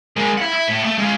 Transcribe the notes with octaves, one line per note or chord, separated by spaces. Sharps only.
G#3 A#4
E4 F#5
E4
A2
A3
G#3 F4